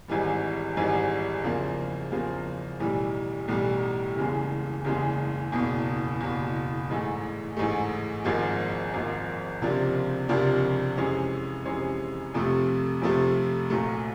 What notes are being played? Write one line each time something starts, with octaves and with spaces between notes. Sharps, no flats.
G#1 G#2 E3 G3
G#1 G#2 E3 G3
E2 C#3 F3 A#3
E2 C#3 F3 A#3
B1 A2 E3 G3
B1 A2 E3 G3
F#1 E2 C#3 E3 G#3
F#1 E2 C#3 E3 G#3
F#1 E2 B2
F#1 E2 B2
A1 G#2 E3 A3
A1 G#2 E3 A3
G#1 G#2 F3 A#3
G#1 G#2 F3 A#3
C#2 C3 F3 A#3 D4
C#2 C3 F3 A#3 D4
F2 C3 E3 G#3 C#4
F2 C3 E3 G#3 C#4
F2 C3 F3 A3
F2 C3 F3 A3
A#1 A#2 F#3 A3